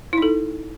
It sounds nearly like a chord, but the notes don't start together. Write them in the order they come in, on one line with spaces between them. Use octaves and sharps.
E4 D#4 A4